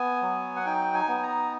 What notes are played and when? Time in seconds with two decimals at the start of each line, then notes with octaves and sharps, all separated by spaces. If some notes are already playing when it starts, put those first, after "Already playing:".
Already playing: B3 G#5
0.22 F#3
0.56 F#5
0.66 D#4 G5
0.94 G#5
1.08 B3
1.23 A#5